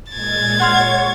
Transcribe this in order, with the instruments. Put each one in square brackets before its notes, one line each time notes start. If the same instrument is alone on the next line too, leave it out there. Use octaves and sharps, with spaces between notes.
[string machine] A#2 G#3 [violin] G#6 A6
[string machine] C#5 [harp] F#5 C6 F6